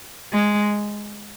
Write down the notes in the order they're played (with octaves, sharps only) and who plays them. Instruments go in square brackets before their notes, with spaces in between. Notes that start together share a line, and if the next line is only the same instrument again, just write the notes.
[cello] G#3